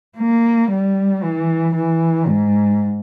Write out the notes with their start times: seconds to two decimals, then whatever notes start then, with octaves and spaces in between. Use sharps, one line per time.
0.18 A#3
0.70 G3
1.23 E3
1.75 E3
2.28 G#2